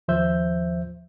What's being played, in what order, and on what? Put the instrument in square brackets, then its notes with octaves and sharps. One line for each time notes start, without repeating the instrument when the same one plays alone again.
[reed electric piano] D#2 F3 C5 E5 G6